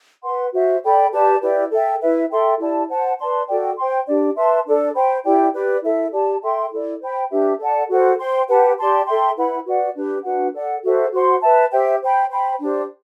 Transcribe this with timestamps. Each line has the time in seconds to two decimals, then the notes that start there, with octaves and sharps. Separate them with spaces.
0.24 B4 F#5 C6
0.53 F#4 C5 E5
0.83 A4 D5 G5 B5
1.12 G4 B4 D5 A5
1.42 E4 G4 B4 D5
1.72 A4 E5 G5
2.01 E4 B4 E5
2.31 A4 E5 G5 C6
2.59 E4 G4 D5 A5
2.89 C5 F#5 A5
3.18 B4 D5 A5 C6
3.47 F#4 A4 D5 G5
3.76 C5 G5 C6
4.07 D4 G4 D5
4.36 B4 E5 A5 C6
4.66 D4 A4 D5
4.94 C5 G5 B5
5.25 E4 G4 D5 G5
5.54 G4 B4 D5
5.83 E4 A4 E5
6.12 G4 D5 A5
6.42 A4 E5 G5 C6
6.71 E4 A4 D5
7.00 C5 G5 B5
7.31 D4 G4 B4 E5
7.59 A4 D5 F#5 A5
7.89 F#4 A4 C5 F#5
8.19 C5 G5 C6
8.48 G4 B4 F#5 A5
8.77 G4 D5 A5 C6
9.07 A4 E5 G5 C6
9.37 E4 B4 F#5 B5
9.65 F#4 B4 D5 F#5
9.95 D4 G4 B4
10.24 D4 F#4 B4 F#5
10.53 A4 D5 F#5
10.83 F#4 A4 C5 E5
11.12 F#4 C5 F#5 C6
11.42 B4 E5 A5
11.72 G4 C5 E5 G5
12.02 C5 G5 B5
12.30 C5 G5 B5
12.59 D4 G4 C5